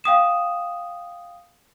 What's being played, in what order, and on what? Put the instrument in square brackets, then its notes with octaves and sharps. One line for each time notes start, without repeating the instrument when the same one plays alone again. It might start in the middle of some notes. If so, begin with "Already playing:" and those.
[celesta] F5 G5 D#6 E7